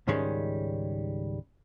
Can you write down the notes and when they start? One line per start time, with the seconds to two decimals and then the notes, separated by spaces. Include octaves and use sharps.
0.07 C#2 G#2 D#3 G3 G#3 C#4